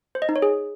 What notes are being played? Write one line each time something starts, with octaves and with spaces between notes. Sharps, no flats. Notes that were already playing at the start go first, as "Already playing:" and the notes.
C5
D#5
D#4
C#5
G#4